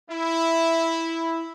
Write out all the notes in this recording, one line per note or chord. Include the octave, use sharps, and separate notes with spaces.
E4